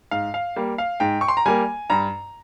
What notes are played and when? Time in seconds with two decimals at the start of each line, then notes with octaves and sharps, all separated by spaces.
0.11 G#2 F5
0.34 F5
0.56 G3 A#3
0.78 F5
1.00 G#2 G5
1.21 C#6
1.28 C6
1.37 A#5
1.46 G3 A#3 G#5
1.90 G2 A#5